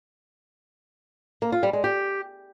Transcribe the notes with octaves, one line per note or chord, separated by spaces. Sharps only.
A#3
F4
G3
G#3
G4